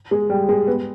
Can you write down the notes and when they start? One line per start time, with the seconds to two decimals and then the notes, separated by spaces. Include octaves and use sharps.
0.11 G#3
0.30 G3
0.49 G#3
0.67 B3